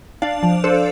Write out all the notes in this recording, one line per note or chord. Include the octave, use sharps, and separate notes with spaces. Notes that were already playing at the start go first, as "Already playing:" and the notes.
D4 D5 F5
F3
D4 A4 C5